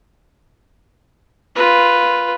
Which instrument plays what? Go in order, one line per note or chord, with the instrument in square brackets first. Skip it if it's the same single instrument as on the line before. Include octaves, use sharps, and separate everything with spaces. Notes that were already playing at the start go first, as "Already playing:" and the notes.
[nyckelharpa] F4 B4